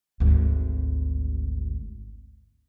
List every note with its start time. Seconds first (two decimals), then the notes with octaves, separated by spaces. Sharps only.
0.20 G#1 D2